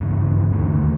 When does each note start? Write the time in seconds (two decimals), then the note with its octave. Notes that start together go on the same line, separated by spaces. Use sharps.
0.01 G2 C#3 E3
0.51 D#2 D3 D#3 A3